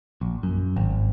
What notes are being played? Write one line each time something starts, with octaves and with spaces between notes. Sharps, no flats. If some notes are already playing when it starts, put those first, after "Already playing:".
A#1
F#2
G#1